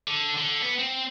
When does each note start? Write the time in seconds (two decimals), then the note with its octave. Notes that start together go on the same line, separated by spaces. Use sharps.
0.08 D3
0.37 D3
0.62 B3
0.79 C4